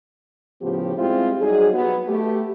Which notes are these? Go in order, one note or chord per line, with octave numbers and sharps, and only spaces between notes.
A2 C#3 F3 B3 G4
G3 G#3 C4 E4 F4 G4
F#3 G3 D#4 G#4
F#3 B3
A3 G4